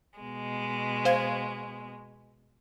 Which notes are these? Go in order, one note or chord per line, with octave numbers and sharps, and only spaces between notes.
B2 G#3
C5 F5 G#6